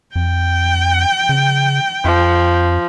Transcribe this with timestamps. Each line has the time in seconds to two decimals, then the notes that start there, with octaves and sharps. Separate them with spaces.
0.16 F2 G5
1.29 C#3
2.05 F2 F3